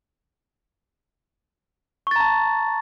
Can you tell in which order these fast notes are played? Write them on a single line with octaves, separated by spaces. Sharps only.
C#6 A6 A#5 A5